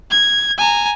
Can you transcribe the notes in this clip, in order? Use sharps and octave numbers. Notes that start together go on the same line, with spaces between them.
G#6
G#5 A#5